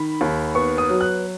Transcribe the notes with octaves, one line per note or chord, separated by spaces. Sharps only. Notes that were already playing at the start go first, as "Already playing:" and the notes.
Already playing: D#3 B5
D#2
B3 C#6
D#6
F#3
F#6